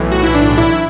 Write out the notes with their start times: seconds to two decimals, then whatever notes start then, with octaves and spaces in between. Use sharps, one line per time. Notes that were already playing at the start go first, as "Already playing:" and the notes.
Already playing: B1 A2 E3
0.12 F#4
0.23 E4
0.34 D4
0.58 E4